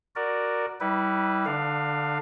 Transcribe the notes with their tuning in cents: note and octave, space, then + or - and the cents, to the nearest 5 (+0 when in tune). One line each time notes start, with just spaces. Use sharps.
F#4 +0 A#4 +0 D5 +5
G3 -20 E4 -30 B4 +0
D3 +0 D4 +25 F5 +0